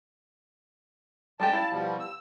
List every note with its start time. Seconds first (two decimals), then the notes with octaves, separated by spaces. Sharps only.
1.40 G3 G#3 G4 A5
1.53 E4 F5
1.71 B2 F3 G3
2.00 E6